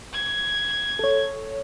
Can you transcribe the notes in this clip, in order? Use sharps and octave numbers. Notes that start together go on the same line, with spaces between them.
G#6
A4 C#5